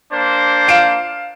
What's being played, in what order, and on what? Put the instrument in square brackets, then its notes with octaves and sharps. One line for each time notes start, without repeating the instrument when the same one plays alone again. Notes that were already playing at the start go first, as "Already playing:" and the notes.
[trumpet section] A#3 D4 C5
[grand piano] F5 D7 E7